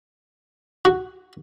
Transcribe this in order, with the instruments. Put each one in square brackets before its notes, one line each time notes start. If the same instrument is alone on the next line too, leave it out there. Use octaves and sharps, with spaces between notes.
[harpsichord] F#4